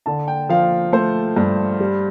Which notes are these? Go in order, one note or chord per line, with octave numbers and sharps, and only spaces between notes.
D3 A5
G5
F3 F5
A3 C5
G2
G3